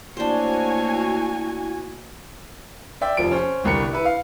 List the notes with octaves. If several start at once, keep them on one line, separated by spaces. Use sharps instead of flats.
A3 A#3 D4 E4 F#4 C5 C#5 G#5
D5 E5 G5
F1 F3 D7
C#4 C5
G1 C2 A#4 C#7
E4 B4
F5